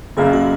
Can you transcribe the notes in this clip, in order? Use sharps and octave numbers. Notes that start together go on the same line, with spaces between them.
F#1 F#2 C#3 A#3 G#4
F#4